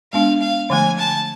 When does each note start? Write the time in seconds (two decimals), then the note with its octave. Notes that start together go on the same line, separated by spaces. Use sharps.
0.13 G#3 B3 D4 F5
0.41 F5
0.70 D3 F3 A3 G#5
0.98 A5